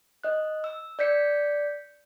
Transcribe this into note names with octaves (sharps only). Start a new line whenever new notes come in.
D#5 F#6
E6
D5 G6 B6 C#7